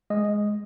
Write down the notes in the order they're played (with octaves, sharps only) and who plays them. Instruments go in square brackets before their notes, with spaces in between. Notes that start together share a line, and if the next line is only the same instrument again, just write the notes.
[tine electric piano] G#3 D#5